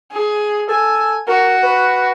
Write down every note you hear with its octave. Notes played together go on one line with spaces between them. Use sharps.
G#4
A4 G#5
F#4 A#4
B4